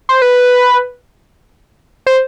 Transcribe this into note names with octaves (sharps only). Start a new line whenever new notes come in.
C5
B4
C5